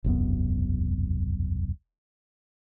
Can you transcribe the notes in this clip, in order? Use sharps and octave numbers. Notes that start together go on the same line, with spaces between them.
E1 C2 F#2 B3